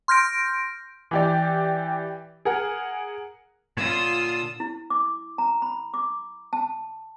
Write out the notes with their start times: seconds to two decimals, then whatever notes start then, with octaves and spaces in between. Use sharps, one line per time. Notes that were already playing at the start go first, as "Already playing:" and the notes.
0.08 C6 F6 G6 A#6 D7
1.11 E3 G4 D5
2.45 G#4 A#4 F#5
3.77 A#2 D3 F4 C#5 D#6 E6
4.60 E4
4.90 D6
5.38 A#5
5.62 B5
5.94 D6
6.53 A5